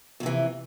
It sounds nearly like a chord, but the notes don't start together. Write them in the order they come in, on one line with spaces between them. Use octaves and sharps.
F2 C3 E3